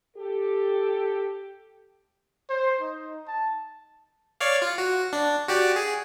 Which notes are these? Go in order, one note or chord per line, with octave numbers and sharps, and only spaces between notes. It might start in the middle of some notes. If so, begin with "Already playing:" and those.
G4 A4
C5
D#4
A5
C#5 D5 F5
F4
F#4
D4
F#4 G4 D5
G#4